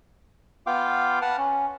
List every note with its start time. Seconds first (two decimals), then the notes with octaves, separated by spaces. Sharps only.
0.67 B3 F4 F5 G5 D6
1.22 B4 F#5 A5 F6
1.38 C#4